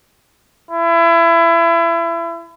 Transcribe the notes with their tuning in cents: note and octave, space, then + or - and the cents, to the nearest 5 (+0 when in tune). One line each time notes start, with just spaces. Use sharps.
E4 +30